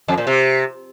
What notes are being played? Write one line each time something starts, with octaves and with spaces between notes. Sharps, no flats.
F2
A#2
C3